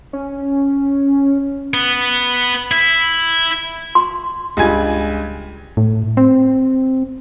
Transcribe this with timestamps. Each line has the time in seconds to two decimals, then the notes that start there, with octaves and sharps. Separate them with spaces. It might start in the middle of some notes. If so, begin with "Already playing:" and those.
0.13 C#4
1.74 B3
2.71 E4
3.95 C6
4.57 C#2 G2 G3 F4 G#5 G#6
5.77 A2
6.17 C4